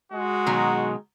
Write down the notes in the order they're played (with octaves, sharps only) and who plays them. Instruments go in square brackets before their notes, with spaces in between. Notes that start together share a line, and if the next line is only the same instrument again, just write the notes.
[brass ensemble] G#3 F#4
[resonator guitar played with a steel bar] B2 D#3 F#3